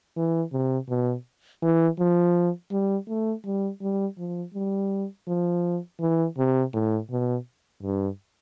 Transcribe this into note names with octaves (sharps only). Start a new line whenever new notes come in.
E3
C3
B2
E3
F3
G3
A3
G3
G3
F3
G3
F3
E3
C3
A2
B2
G2